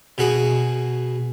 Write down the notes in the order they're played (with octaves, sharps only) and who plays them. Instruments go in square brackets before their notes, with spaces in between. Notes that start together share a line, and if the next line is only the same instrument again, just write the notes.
[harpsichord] B2 F#4 G#4